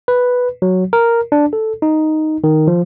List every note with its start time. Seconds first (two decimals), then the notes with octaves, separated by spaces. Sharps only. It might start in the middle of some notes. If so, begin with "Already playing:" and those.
0.08 B4
0.62 F#3
0.93 A#4
1.32 D4
1.53 A4
1.82 D#4
2.44 D#3
2.67 F3